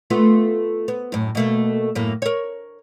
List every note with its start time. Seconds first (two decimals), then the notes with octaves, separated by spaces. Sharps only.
0.10 A3 B3 F4
0.88 B3
1.12 F#2 A2
1.35 B2 A3 A#3
1.95 F#2 A2 A#3
2.22 A#4 C#5